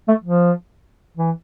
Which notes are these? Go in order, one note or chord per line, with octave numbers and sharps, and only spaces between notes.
A3
F3
E3